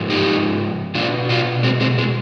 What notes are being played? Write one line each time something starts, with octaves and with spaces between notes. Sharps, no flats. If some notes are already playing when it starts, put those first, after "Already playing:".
Already playing: G#2 F3
D#4 G4
B2 D4 F4
D4 F4
G#3 C4
G#3 C4
G#3